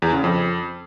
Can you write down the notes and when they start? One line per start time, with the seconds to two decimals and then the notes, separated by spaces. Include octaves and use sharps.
0.02 E2
0.13 C#3
0.24 F2